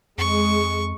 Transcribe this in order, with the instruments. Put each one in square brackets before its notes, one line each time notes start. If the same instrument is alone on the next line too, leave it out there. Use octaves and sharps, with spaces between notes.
[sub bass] F2 [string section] G#3 [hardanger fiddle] C#6